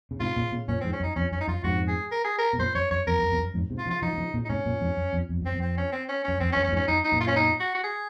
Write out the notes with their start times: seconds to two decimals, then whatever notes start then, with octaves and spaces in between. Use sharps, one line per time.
0.11 C#3
0.20 G#2 C3 F4
0.36 A#2 C#3
0.52 A#2 C#3
0.68 F#2 A#2 C#4
0.81 F2 G#2 C4
0.93 C#4
1.00 F#2
1.03 D#4
1.16 F2 C#4
1.32 F#2 C#4
1.41 D#4
1.48 F#2 F4
1.64 F2 G#2 F#4
1.88 G#4
2.12 A#4
2.24 G#4
2.38 A#4
2.53 C3
2.59 F#2 A#2 C5
2.75 F#2 C#5
2.91 F#2 C#5
3.07 F2 A#4
3.18 F2
3.23 F#2
3.32 F2
3.38 F#2
3.54 F2 G#2
3.70 G#2 C3
3.78 F4
3.86 C#3 F3
3.90 F4
4.02 C#3 F3 D#4
4.13 F#3
4.17 C#3 F3
4.34 A#2 C#3
4.45 D#4
4.49 G#2 C3 C#4
4.65 F#2 A#2
4.81 F2 G#2
4.97 F#2
5.13 F2
5.29 F2
5.42 F#2 C4
5.55 F2
5.61 C4
5.77 C#4
5.92 C4
6.09 C#4
6.24 F#2 C#4
6.40 F2 C4
6.52 C#4
6.56 F#2
6.64 C#4
6.68 F#2
6.72 F2 G#2
6.76 C#4
6.88 F#2 D#4
7.04 D#4
7.12 F#2 A#2
7.20 F4
7.27 C#4
7.36 D#4
7.60 F#4
7.75 F#4
7.83 G#4